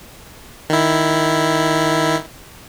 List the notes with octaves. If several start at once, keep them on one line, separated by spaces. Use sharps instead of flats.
D#3 E4